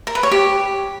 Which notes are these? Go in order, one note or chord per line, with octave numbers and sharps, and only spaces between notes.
A#4
B4
C#5
G4